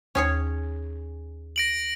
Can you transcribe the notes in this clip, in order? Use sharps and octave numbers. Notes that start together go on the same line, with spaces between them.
D#2 C#4 G#4 C#5 G#5
A#6 D7 F#7